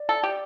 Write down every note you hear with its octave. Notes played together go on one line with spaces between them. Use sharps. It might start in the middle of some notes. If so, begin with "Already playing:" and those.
Already playing: D5
A4
G4